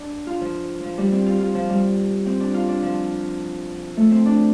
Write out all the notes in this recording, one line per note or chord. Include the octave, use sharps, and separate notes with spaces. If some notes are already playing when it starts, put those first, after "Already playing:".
Already playing: D4
F4
F3
F3
G3
C4
F4
F4
F3
G3
C4
D4
F4
D4
F3
A3
C4
D4